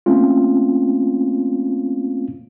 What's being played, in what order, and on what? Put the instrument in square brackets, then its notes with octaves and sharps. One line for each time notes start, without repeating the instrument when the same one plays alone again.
[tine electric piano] A3 A#3 C4 C#4 F4